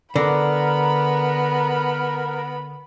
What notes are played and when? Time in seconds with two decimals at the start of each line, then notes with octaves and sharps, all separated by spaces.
0.16 D3 B3 A#4 B5